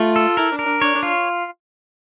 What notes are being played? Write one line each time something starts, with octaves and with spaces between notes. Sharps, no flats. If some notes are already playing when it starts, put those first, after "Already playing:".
Already playing: A3 F4
A4
E4 A#4
D4
A#4
D4
D4 C#5
D4
F4